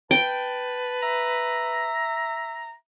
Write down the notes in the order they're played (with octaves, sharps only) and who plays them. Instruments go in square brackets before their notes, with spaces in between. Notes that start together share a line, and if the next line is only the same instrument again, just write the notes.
[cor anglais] B4 [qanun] G5 [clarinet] A5
[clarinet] E5 [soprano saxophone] A#5